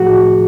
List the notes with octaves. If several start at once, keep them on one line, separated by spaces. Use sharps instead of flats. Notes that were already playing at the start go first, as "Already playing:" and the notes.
Already playing: A2 F3 A3 F#4 G#4